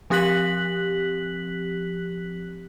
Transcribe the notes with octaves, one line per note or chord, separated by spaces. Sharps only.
F3 C4 G4 F#6 B6 F#7